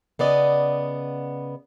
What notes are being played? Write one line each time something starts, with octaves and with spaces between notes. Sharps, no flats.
C#3 B3 D5 D#5